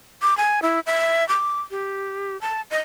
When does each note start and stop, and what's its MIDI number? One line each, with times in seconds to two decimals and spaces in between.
0.22 0.37 86
0.37 0.60 80
0.62 0.80 64
0.86 1.27 76
1.29 1.59 86
1.71 2.39 67
2.41 2.62 81
2.71 2.80 75